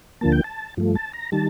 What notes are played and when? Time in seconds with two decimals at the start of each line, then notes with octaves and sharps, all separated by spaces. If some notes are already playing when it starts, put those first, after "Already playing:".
0.21 D2 D3 F3 A#3 A5
0.32 G5
0.44 A5
0.77 G2 F3 A3
0.95 A5
1.13 A#5
1.32 D#3 G3 A5